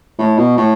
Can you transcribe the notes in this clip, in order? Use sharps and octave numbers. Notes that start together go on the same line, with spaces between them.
A2
B2
A2